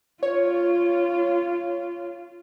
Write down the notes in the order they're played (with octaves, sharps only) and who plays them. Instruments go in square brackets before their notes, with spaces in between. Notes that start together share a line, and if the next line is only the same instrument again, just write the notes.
[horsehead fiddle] F4 [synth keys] C#5